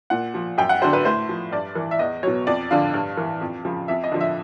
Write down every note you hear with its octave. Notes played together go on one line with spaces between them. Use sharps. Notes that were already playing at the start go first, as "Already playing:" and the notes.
A#2 F#5
F3
F#2 G5
F#5
D3 F#3 C5
B4
A2 C5
F3
G2 D5
E3
E5
E2 D#5
B2 F#3 C#5
F2 D5
D3 F3 F5
G2
E3
F2
C#3 F3
F2 E5
D#5
D3 F3
E5